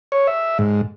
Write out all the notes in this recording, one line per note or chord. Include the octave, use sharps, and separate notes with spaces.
C#5
E5
G#2